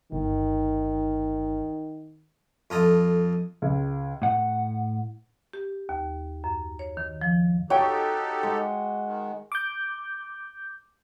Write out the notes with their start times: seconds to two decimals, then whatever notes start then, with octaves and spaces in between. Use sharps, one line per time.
0.12 G1 D#3
2.70 F2 F4 A4 D#5
3.62 C#2
4.22 A2 F#5
5.53 G4
5.89 D#2
6.44 F#2
6.79 C#5
6.97 D#3
7.21 F3
7.70 D#4 F#4 G4 A4 C#5 G5
8.43 G#3
9.05 D#3
9.52 D6 G6